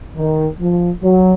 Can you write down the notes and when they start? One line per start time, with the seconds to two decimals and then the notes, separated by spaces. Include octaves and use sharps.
0.16 D#3
0.60 F3
1.03 F#3